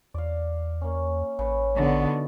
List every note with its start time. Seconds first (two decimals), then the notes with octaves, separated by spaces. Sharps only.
0.14 E2 D5 F5
0.81 A#3 C#4
1.39 A1 C#3 B4
1.76 D3 B3 D4 D#4 F#4